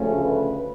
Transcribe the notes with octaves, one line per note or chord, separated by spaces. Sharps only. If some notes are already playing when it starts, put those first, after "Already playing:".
Already playing: D2 C#3 F3 A3 C#4
B4